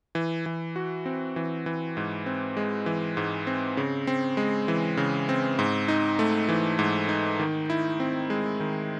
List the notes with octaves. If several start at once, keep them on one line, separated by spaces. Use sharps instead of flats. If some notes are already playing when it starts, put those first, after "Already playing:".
E3
E3
F#4
C4
E3
E3
G#2
C4
G#3
E3
G#2
C4
C#3
C4
G#3
E3
C#3
C4
G#2
D#4
A3
E3
G#2
D#4
D#3
E4
C4
G#3
D#3